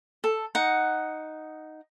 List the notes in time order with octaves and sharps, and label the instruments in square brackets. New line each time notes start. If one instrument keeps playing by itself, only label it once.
[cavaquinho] A4
D#4 F#5